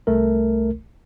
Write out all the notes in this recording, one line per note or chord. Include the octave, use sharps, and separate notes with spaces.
C2 A3 A#4